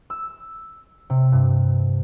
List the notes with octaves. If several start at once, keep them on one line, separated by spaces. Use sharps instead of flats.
E6
C3
G2